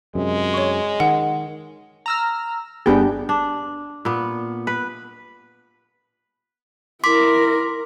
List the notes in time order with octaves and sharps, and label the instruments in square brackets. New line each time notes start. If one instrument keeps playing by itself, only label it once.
[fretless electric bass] F#2 C3 [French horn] G#3
[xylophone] C#5 C#6
[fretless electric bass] D#3 [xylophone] F#5
[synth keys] A#5 E6 F6
[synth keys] G1 B3 G5 [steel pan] D4 G4 G#4
[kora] D4
A#2 B3
B4
[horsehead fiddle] E4 A#4 [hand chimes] C6 D6 B6